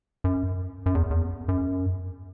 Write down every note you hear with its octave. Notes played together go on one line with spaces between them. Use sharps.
F#2
F#2
E2
E2
F#2